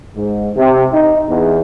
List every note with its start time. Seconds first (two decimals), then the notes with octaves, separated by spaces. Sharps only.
0.15 G#2
0.56 C3
0.92 D#4
1.28 E2